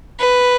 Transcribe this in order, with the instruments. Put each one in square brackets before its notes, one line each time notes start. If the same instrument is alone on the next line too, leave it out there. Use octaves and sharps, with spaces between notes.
[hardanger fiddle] B4